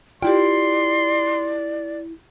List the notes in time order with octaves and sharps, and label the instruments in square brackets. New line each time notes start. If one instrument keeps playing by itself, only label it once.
[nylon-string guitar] E4 G5 [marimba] F4 G4 [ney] D5 [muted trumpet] C6